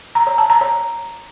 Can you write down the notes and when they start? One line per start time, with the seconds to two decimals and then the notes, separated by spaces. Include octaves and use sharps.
0.15 A#5
0.27 C#5
0.38 A5
0.50 A#5
0.61 C#5